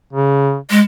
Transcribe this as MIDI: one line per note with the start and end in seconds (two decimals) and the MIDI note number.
0.13 0.57 49
0.70 0.81 56